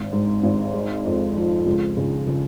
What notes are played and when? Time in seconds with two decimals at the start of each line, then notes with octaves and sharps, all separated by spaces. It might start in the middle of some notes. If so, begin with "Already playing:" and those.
Already playing: G#1
0.13 G#2
0.43 G#1
0.74 G#3
1.05 F2
1.36 F3
1.66 C#2
1.97 C#3
2.27 C#3